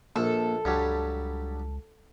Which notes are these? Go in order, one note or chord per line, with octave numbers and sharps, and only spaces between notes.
A#1 A#3 A4
C#2 G2 F#3 G3